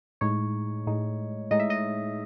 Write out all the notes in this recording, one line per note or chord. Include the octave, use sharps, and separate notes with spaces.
A2 G#3 D#4 C#5
A2 G#3 D#4
A2 G#3 D#4 D#5
E5
D#5